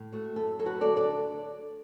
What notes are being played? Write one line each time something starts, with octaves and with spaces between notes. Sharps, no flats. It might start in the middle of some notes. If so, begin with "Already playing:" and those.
Already playing: A2
A3 F#4
F#2 A4
F#3 A4
F#4 B4
D2 A4 D5
A4 D5
D4